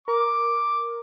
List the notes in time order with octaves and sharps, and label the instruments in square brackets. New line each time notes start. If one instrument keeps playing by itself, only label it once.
[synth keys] A#4 [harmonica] D6